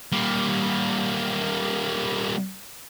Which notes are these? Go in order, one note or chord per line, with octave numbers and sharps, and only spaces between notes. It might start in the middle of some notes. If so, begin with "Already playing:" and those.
G3 A#3